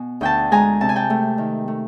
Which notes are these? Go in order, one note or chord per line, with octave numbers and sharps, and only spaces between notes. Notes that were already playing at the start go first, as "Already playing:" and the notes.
Already playing: B2 G#5
D2 G5 A5
G#3 G#5 A#5
C3 A5
G#5
G5 A5
A3
D#3
A3